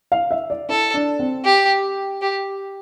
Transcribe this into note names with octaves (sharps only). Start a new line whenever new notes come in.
F5
E5
D5
E4 A4
D4
C4
G4
G4